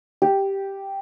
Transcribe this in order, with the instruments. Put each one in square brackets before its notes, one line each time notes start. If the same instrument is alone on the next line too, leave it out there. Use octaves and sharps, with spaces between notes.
[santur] G4